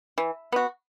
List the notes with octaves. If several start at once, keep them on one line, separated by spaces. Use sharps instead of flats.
E3
B3 F#4